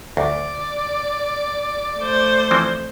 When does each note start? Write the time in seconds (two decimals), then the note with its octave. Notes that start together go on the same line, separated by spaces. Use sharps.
0.17 D2 D5
1.98 A3 C5
2.51 E3 F3 C4